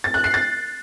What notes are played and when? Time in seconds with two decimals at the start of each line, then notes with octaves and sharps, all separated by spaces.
0.04 A6
0.14 F#6
0.24 C7
0.34 A6